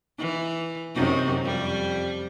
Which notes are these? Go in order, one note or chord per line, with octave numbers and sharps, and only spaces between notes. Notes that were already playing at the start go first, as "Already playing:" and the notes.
E3
F#2 C3 D#4
F2 G3